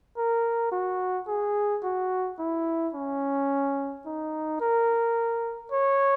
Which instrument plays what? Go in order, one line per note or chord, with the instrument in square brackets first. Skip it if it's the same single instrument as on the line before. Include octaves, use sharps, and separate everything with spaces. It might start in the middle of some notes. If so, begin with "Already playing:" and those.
[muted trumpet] A#4
F#4
G#4
F#4
E4
C#4
D#4
A#4
C#5